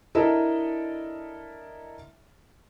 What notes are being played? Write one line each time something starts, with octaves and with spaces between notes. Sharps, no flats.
D4 E4 A4 A#4 D#5 E5